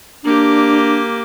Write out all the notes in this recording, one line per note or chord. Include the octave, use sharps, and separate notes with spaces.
A#3 D4 G4